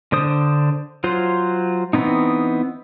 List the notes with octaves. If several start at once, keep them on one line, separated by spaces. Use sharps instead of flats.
D3 D4 C5 D#6
F#3 F4 C5
E3 B3 C4 D#4